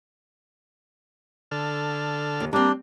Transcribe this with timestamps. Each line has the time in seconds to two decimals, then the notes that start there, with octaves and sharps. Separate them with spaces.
1.51 D3 A4 F6
2.40 D#2
2.53 G3 A#3 C4 D4